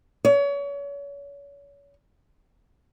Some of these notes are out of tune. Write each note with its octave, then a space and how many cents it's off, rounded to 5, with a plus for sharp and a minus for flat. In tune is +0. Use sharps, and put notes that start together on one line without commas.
C#5 +35